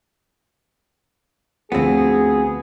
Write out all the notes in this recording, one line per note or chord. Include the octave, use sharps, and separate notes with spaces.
D2 F3 B3 C4 G#4